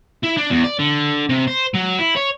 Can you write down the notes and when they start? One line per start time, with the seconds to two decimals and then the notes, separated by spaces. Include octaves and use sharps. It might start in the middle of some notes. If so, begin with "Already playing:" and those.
0.23 E4
0.37 D4
0.50 E2
0.64 D5
0.79 D3
1.30 C3
1.48 C5
1.75 F#3
2.00 E4
2.16 C#5